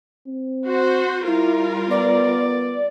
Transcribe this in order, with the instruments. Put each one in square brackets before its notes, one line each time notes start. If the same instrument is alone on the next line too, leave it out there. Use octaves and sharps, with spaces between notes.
[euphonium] C4
[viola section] F#4 C5
[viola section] G3 F4 A#4 [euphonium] E4
[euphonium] B3 [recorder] D5